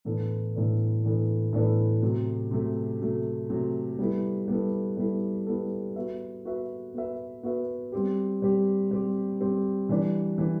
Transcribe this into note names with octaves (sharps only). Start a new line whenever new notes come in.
A2 E3 B3 D4 A4
A2 E3 B3 D4 A4
A2 E3 B3 D4 A4
A2 E3 B3 D4 A4
C3 F#3 A3
C3 F#3 A3
C3 F#3 A3
C3 F#3 A3
G3 B3 E4 A4
G3 B3 E4 A4
G3 B3 E4 A4
G3 B3 E4 A4
B3 F#4 B4 E5
B3 F#4 B4 E5
B3 F#4 B4 E5
B3 F#4 B4 E5
G3 C4 G4
G3 C4 G4
G3 C4 G4
G3 C4 G4
E3 G3 D4
E3 G3 D4